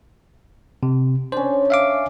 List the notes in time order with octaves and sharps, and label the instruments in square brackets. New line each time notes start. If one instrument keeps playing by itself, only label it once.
[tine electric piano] C3
[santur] C#4 D4 [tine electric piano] C5
[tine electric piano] E5 F5 D6